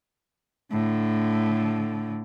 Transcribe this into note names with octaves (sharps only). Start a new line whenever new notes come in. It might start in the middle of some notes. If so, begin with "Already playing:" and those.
A2 D3